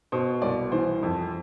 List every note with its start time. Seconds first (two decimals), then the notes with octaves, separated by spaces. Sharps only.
0.12 B2 C5
0.42 C2 D5
0.72 E3 C5
1.03 F2